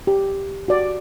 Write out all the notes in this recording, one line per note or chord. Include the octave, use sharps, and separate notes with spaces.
G4
F#4 D5